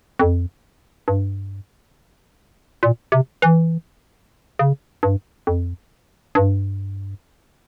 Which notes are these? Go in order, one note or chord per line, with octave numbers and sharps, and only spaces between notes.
F2
G2
A#2
C3
E3
C#3
G2
F2
G2